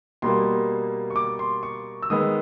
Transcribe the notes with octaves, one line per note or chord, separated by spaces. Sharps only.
B2 G3 A#3 C6
C#6
D6
C6
C#6
E6
D#3 G#3 B3 D#6